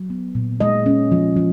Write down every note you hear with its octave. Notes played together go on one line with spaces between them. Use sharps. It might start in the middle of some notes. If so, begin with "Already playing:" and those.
Already playing: F#3
B3
A#2
G#3 D#5
C#4
F3
F3